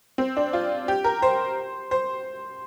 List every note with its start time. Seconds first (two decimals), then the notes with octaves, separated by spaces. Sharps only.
0.18 C4
0.37 D4
0.53 F4
0.88 G4
1.04 A#4
1.22 C5
1.91 C5